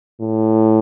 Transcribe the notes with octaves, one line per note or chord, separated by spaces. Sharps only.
A2